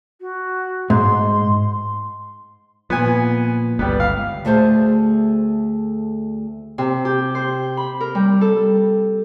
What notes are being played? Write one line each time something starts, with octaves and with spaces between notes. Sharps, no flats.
F#4
G#2 C6
A#2 F3 B3 G#5
G1 C#2 G3 B3
F5
D2 A3 G#4 C5 A5
C3
G4
C5
B5
A#4
G3
A4